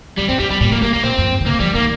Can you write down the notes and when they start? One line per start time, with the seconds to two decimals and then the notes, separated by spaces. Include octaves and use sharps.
0.18 F2 G3
0.29 G2 C4
0.40 G2 G3
0.50 G2 G3
0.61 A#2 G3
0.72 F3 A#3
0.82 G3 A#3
0.94 A#3
1.03 A#2 C4
1.18 F2
1.33 G2
1.41 D#3
1.46 C3 A#3
1.60 F3 G3
1.75 D#3 A#3